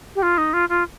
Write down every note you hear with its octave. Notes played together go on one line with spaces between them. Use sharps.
G4
F4
D#4
F4
F4